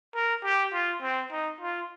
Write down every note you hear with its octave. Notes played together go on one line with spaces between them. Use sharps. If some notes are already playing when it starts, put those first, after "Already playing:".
A#4
G4
F4
C4
D#4
F4